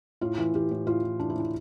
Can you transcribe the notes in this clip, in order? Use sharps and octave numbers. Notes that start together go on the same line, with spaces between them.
A2 F4
E3
E3 G4
A2
A2 F4
E3
E3 D4
E4
A2 D4